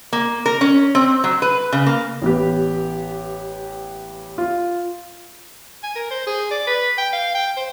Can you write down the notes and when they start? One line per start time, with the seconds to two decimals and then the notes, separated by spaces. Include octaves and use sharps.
0.13 A#3
0.46 A#4
0.61 C#4
0.95 C4
1.24 F#3
1.42 B4
1.73 C#3
1.86 A#3
2.22 A1 B3 G4
4.38 F4
5.83 G#5
5.95 A#4
6.10 C5
6.27 G#4
6.51 D5
6.67 B4
6.98 G5
7.13 F5
7.35 G5
7.57 C5